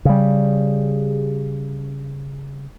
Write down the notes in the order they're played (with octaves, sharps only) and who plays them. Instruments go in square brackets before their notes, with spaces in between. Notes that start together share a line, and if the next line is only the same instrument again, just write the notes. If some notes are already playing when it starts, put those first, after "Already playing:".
[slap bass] C#3 G3